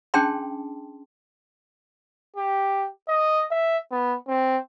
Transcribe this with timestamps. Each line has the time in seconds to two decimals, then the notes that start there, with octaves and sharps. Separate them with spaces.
0.14 C#4 D4 G#4 G5 A5 C6
2.36 G4
3.08 D#5
3.51 E5
3.92 B3
4.28 C4